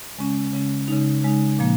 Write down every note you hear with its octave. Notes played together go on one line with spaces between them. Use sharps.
C#3 G#3 C#4
C#3 G#3 C#4
C#3 G#3 D#4
C#3 G#3 D#4
A#2 F3 A#3